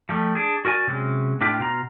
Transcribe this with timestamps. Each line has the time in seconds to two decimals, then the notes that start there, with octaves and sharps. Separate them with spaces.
0.09 F3 G3 A3
0.35 D4 G#4
0.65 F#4 A#4 D5 G#5
0.87 C3 F#3 G#3 C#4
1.41 A2 D4 F4 G4
1.60 B2 F4 A#5